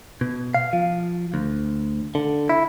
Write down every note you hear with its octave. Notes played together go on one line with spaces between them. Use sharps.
B2
F5
F3
D2
D3
E4